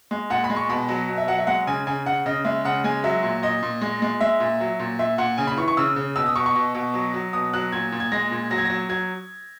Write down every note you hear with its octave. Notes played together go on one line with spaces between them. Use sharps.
G#3
A#2 F#5
B5
G#3
C#6
B2 B5
F#3
B2
E5
F#3 F#5
E5
G#3 F#5
C#3 G#5
C#3 G#5
C#3 F#5
C#3 D#5
G#3 E5
C#3 F#5
G#3 G#5
F#3 E5
A#2
A#2 D#5
A#2
G#3
G#3
G#3 E5
A#2
F#3
A#2
A#2 E5
A#2 F#5
C#3 G#5
B5
E3 C#6
C#6
C#3 E6
C#3
B2 E6
D#6
B2 C#6
C#6
B2
B2
F#3
F#3
B2 D#6
F#3 F#6
A#2 G#6
A#2
G#6
G#3 A#6
A#2
F#3 A#6
G#6
F#3 A#6
F#3 G#6